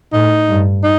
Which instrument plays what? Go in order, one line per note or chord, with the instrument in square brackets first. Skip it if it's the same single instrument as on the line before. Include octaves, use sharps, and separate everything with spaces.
[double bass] A2 [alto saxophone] D#4
[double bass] G2
[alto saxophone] D#4